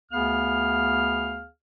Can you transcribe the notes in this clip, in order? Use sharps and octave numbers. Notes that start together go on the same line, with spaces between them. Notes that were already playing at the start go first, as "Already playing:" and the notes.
D2 B3 G#4 F5 F6